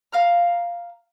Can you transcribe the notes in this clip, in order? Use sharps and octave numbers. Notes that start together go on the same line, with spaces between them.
F5 A#5 F6